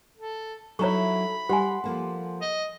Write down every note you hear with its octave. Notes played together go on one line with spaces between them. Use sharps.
A4
F#3 D#4 E4 A4 C#5 A#5 B5 C#6
G3 G4 F#5 G#5 C6
F3 A#3 A4
D#5